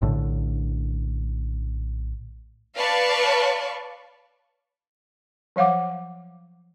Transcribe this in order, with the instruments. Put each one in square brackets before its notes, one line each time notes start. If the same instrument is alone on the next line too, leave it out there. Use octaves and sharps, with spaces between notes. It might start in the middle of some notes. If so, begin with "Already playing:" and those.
[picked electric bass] A#1 A2 D3
[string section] B4 D5 F5 A5 C#6
[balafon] F3 F#3 F5 F#5 D6